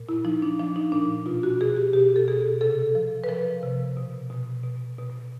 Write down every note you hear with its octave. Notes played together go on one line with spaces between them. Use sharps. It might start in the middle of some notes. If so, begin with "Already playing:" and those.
Already playing: A#2
E4
F3 D#4
D4
F3 D4
D#4
A#2 D4
B2 F4
F#4
B2 G#4
G4
B2 G4
A4
B2 G#4
C3 A4
F3
B4
F3 A#4
C3
B2
B2
B2
B2